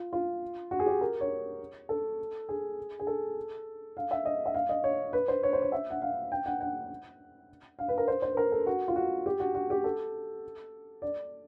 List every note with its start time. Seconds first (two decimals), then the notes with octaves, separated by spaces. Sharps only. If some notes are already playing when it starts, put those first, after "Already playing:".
Already playing: F4
0.13 F4
0.71 F#4
0.80 G#4
0.86 G4
1.01 A#4
1.21 C#5
1.89 A4
2.49 G#4
3.00 G#4
3.07 A4
3.97 F5
4.11 E5
4.25 D#5
4.46 E5
4.54 F5
4.69 D#5
4.84 C#5
5.13 B4
5.28 C5
5.43 C#5
5.53 C5
5.62 C#5
5.72 E5
5.90 F#5
6.02 F5
6.32 G5
6.46 F#5
6.61 F#5
7.79 F5
7.88 B4
7.98 A#4
8.08 C5
8.22 C5
8.32 B4
8.37 A#4
8.52 A4
8.67 F#4
8.88 F4
8.96 F#4
9.26 G4
9.40 F#4
9.55 F#4
9.70 G4
9.84 A4
11.02 D5